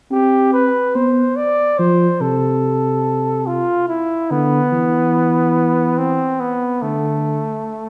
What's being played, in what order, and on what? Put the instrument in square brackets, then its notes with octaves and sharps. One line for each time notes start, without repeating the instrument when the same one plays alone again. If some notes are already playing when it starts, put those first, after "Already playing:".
[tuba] C4 [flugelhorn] G4
[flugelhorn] B4
[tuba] B3 [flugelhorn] C5
[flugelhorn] D5
[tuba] F3 [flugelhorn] C5
[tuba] C3 [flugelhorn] A4
[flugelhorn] F4
E4
[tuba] D3 [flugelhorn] B3
[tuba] E3
[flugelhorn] C4
B3
[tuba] D3 [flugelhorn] A3